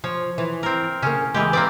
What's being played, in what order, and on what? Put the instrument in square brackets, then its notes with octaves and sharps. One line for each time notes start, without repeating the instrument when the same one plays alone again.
[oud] F3 [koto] C#5
[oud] E3
[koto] C4 A#4
[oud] C#3 A#3 [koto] C#4
[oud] D#2 G#3 [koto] E3 G4
[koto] A#3 C4 D5 [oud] B4